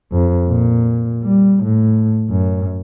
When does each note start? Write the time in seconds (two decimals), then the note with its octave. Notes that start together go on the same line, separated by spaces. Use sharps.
0.12 F2
0.49 A#2
1.23 G3
1.64 A2
2.30 F#2